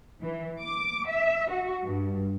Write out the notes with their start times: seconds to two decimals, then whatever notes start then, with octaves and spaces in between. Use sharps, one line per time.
0.21 E3
0.61 D6
1.09 E5
1.50 F#4
1.83 G2